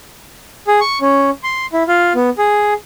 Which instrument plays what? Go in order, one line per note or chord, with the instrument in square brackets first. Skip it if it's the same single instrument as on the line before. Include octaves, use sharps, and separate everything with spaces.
[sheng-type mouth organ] G#4
C#6
C#4
C6
E4
F4
B3
G#4